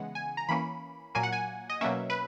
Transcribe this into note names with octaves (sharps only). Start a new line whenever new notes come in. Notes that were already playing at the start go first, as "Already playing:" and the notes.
Already playing: C#3 E3 G#3 B3 F#5
G#5
A#5
E3 A#3 C#4 B5
A#2 F#3 A#3 G#5
F#5
G#5
D#5
B2 F#3 A#3 C#4 E5
B4